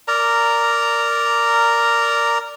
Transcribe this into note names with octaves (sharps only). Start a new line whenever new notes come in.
A#4 D5 A#5